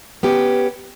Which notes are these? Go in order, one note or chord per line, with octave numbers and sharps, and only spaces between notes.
B3 C#4 G4